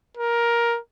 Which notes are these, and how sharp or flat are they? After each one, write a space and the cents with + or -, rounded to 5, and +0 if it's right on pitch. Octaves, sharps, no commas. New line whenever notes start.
A#4 +15